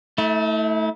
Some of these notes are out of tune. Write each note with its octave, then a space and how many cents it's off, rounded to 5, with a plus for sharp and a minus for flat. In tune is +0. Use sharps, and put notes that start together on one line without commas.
A3 +0 E4 -40